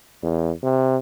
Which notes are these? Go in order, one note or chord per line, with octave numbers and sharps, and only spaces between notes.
E2
C3